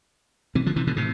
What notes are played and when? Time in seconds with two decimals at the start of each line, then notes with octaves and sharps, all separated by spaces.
0.55 C3 E3
0.66 D3 F3
0.76 C3 E3
0.87 B2 D3
0.96 A2 C3